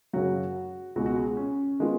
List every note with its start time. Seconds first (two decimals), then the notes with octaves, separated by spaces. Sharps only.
0.13 F#2 C#3 F#3 F#4
0.96 C#2 B2 G#3 F#4
1.06 F#4
1.17 G#4
1.37 C#4
1.80 D#3 G#3 B3 F4